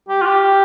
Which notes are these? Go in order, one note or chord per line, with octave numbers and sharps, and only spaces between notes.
G4
F4
G4